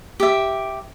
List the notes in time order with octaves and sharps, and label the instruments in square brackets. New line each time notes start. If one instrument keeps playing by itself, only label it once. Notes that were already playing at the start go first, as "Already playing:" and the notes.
[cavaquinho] G4 E5